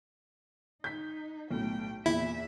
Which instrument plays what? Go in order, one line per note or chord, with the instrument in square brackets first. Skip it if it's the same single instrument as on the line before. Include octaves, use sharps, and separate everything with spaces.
[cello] D#4 [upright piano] G6 B6
[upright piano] B1 A2 [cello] A3 G5
[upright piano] E2 A#2 [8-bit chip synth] E4 [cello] E5